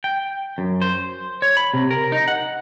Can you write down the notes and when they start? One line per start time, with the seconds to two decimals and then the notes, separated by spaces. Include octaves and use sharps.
0.04 G5
0.58 F#2
0.82 C5
1.42 C#5
1.57 B5
1.74 C3
1.91 A#4
2.12 D#4
2.28 F#5